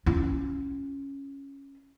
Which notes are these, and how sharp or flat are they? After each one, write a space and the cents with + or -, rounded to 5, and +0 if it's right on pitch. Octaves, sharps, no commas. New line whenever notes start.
C#4 -5 F4 -30